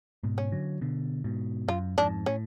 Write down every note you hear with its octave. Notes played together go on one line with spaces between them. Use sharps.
G#2 B2
C#4
D3 F#3
B2 D3
G#2 B2
F#2 F4
F2 G#2 D4
A2 C#4